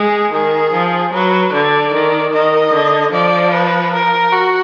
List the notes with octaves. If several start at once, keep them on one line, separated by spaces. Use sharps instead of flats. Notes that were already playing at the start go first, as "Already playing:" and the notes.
Already playing: G#3 G#4
D#3 G#4
F3
F#3 B4
D3 D5
D#3
D#3 D#5
D3
F3 D5
B4
A#4
F#4